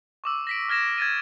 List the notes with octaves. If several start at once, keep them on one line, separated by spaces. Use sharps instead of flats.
C#6 D6 E6
A#6 B6 D7
E6 F6 G#6 A#6 E7
G#6 A6 D#7